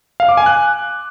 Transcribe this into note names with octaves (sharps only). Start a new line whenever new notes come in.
F5
D6
G#5
F#6